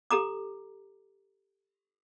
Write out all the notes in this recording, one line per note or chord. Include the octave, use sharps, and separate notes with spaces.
G4 A4 A#5 D6